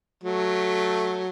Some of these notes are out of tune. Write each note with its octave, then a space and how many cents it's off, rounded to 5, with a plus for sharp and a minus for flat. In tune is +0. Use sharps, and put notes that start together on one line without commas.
F#3 +0 A3 +0